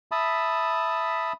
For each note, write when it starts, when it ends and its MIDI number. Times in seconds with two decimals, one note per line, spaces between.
0.12 1.33 76
0.12 1.33 81
0.12 1.33 83
0.12 1.33 87